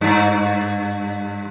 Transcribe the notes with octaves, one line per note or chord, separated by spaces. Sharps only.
G2